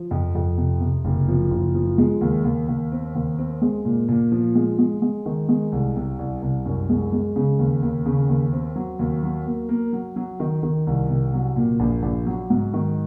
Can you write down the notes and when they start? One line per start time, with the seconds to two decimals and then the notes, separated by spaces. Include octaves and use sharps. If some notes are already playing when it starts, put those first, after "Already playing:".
Already playing: F3
0.11 F2
0.35 F2
0.58 C3
0.81 C3
1.05 F#1
1.28 F3
1.51 F#1
1.75 F3
1.98 G#3
2.21 D#2
2.45 D#2
2.68 D#2
2.92 C4
3.15 D#2
3.38 C4
3.62 G#3
3.85 A#2
4.08 A#2
4.32 F3
4.55 G#3
4.79 G#3
5.02 G#3
5.26 D#3
5.49 G#3
5.72 C2
5.96 C3
6.19 C2
6.42 C2
6.66 F#2
6.89 G#3
7.12 G#3
7.36 C#3
7.59 D#2
7.82 D#2
8.06 C#3
8.29 D#2
8.53 C4
8.76 F#3
8.99 D#2
9.23 F#3
9.46 A#3
9.69 A#3
9.93 F#3
10.16 F#3
10.40 D#3
10.63 D#3
10.87 C2
11.10 C3
11.33 F#3
11.56 A#2
11.80 A#1
12.03 A#1
12.26 F#3
12.50 G#2
12.74 D#3